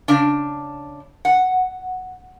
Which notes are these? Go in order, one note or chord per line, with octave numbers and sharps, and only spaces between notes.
C#3 D4
F#5